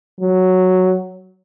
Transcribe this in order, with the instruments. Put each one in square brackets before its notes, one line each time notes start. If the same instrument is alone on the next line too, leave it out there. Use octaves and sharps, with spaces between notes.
[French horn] F#3